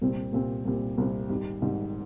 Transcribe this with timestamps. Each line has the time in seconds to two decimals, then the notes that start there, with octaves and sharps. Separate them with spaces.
0.02 C2 A#2 G3 C4
0.33 C2 A#2 G3 C4
0.65 C2 A#2 G3 C4
0.98 C2 A#2 G3 C4
1.29 G#1 G#2 G3
1.62 G#1 G#2 G3